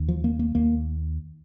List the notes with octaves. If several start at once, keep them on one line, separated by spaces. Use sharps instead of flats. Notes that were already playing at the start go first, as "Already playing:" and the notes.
Already playing: D#2
F3
A#3
A#3
D#2 A#3